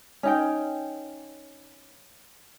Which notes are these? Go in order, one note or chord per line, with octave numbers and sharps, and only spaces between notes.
C#4 D#4 G5